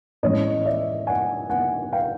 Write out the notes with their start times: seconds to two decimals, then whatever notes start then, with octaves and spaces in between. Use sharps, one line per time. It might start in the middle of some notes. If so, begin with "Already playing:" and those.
0.23 A2 E3 G#3 C#4 C#5 D#5
0.65 D5 E5
1.07 F#5 G#5
1.50 F#5 G#5
1.93 F5 G5